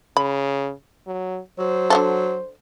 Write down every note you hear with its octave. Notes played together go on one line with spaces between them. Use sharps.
C#3 B5
F#3
F#3 C5
D3 G#3 A4